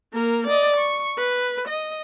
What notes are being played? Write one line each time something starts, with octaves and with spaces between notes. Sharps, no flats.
A#3 A#4
D5 D#5
C#6
B4
D#5